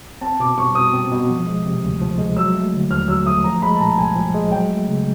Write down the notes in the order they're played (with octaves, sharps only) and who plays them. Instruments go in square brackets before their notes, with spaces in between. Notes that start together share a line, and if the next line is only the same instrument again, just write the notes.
[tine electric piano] C4 [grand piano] A5
[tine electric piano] B2 [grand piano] D6
[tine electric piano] G3 [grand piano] C#6
[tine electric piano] B2 [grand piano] D#6
[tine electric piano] C4
B2
F3
G#3
C3
D2
F3
G#3
[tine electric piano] F#3 [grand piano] E6
[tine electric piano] A3
D3
[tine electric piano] D#2 [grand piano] F6
[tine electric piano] F#3 [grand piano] E6
[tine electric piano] A3 [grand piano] D#6
[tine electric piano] F3 [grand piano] A#5
[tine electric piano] G#3 [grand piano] B5
[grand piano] A5
[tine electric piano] A#2 [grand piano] A#5
[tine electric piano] C2 [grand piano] G#5
[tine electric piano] F3
G#3
[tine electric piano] F#3 [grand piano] G5
[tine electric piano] A3
C#3